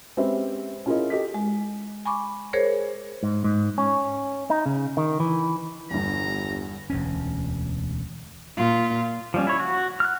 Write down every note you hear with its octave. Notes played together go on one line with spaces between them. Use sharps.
G#3 C4 C#4 G4 B4 E5
C#4 E4 F4 G#4 A#4 D#5
G4 A4 D#5 B6
G#3
G#5 B5 C#6 D6
G#4 A#4 C5 C#5
G#2
G#2
C#4
D#4
C#3
D#3
E3
G1 E2 G2 A#5
E1 D2 C#4
A#2 F4
F3 G3 C#4
E4 C#5
F#4
F6 F#6